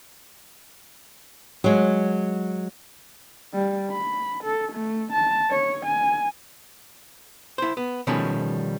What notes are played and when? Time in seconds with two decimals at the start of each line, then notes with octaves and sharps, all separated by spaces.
1.64 F#3 G#3
3.54 G3
3.91 B5
4.44 A4
4.73 A3
5.13 A5
5.51 C#5
5.86 G#5
7.58 E4 C5
7.77 B3
8.07 B2 D#3 F3 G3 A3 C#4